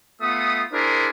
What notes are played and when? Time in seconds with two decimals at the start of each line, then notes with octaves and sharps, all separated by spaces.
0.21 A3 B3 F4 D#6
0.72 D4 E4 G#4 A#4 C5